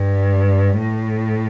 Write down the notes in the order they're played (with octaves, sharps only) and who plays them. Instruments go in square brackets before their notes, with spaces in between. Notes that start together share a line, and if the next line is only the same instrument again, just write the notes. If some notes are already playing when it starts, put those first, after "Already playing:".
Already playing: [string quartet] G2
A2